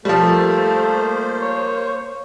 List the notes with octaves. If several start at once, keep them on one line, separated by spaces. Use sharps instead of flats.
F3 G3 A3 A#3 C5
C#5